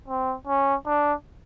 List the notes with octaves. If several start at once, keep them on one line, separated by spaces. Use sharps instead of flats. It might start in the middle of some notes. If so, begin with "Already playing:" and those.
C4
C#4
D4